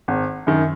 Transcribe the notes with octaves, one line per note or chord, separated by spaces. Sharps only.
G#1
F#2 D#3